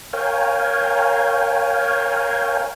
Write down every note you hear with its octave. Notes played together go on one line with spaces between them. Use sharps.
A#4 C#5 F5 G5 G#5